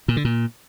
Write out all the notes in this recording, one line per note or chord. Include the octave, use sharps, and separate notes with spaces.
A#2
D3
A#2